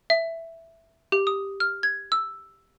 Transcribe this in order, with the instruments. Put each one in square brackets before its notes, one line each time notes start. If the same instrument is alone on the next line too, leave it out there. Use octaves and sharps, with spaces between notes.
[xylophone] E5
G4
D#6
F6
G#6
E6